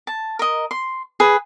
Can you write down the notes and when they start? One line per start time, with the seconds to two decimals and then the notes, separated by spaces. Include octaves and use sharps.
0.07 A5
0.39 A#4 D#5
0.71 C6
1.20 G#4 B4